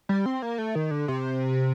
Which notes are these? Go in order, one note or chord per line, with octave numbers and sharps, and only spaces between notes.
G3
C4
A#3
A3
D#3
D3
C3